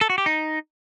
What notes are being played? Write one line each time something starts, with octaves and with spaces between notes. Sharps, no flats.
A4
F#4
G4
D#4